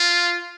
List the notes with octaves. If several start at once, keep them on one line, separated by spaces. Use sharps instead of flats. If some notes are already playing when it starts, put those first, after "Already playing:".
Already playing: F4